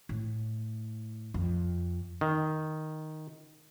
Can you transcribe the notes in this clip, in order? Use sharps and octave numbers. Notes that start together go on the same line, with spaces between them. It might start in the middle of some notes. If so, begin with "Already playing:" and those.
A2
F2
D#3